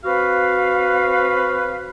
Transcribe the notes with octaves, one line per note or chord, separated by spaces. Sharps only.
C4 F#4 B4 F5